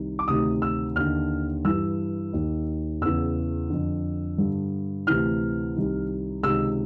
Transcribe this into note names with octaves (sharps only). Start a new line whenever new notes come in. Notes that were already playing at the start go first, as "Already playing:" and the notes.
Already playing: C2 C3 D#3
D6
D2 C3 D#3 D#6
E6
D#2 D3 F6
G2 E3 E6
D#2 D#3
E2 C#3 E3 E6
F2 D3
G2 D3
D2 C3 E3 F6
C2 C3 D#3
C#2 C3 D#3 E6